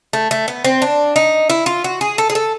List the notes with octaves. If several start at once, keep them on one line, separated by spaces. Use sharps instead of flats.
A3
A3
B3
C4
D4
D#4
E4
F4
F#4
G#4
A4
G#4
A4